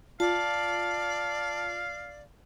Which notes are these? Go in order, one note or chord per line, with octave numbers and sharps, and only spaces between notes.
F4 D5 F5 A5